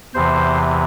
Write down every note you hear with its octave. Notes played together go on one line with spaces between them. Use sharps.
E2 C3 E3 C5